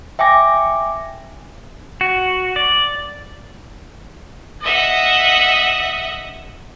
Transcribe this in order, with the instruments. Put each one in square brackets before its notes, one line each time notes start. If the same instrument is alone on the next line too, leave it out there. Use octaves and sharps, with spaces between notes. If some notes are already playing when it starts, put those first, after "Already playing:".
[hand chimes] E5 G5 G#5 D6 A#6
[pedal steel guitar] F#4
D5
[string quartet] D#5 E5 F#5